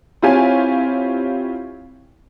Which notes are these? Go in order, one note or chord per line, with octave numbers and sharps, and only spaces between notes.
C4 E4 F4 G4 C#5 G#5